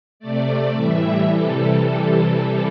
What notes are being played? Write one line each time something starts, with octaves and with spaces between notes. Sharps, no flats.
C3 A3 D5
A2 E3 G3 E5
C3 E3 G3 A4